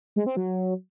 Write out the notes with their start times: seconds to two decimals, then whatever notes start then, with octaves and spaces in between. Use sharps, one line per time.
0.16 G#3
0.26 C4
0.37 F#3